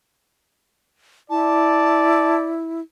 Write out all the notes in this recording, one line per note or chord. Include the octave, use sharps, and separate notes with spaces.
E4 D5 A5